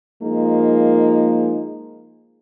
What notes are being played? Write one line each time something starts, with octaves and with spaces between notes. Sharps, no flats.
F3 G#3 A#3 D#4